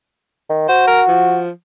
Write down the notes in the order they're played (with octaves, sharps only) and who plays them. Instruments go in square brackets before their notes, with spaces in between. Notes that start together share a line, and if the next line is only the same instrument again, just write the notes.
[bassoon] D#3
[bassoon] F#4 [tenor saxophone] C5
[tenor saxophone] A#4
F3